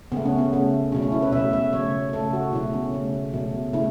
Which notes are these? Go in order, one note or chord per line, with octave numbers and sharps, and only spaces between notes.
C#3 A3 B3
C#4
B3
C#3 A3
B2 F#3 A3 C#4
C#4
E4
B4
B2 F#3 A3 E5
E5
C#3 F#3 A3 C#5
C#3 A3 A4
F#4
B2 F#3 A3 E4
C#4
C#3 A3
B2 F#3 A3
C#3 A3 E4